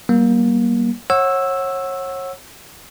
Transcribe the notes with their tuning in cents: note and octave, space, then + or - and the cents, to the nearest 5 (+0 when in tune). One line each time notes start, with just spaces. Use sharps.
G3 -30 A#3 +25
C#5 -30 F#5 -5 E6 +0